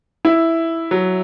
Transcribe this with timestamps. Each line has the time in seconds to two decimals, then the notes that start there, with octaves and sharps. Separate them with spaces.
0.25 E4
0.91 F#3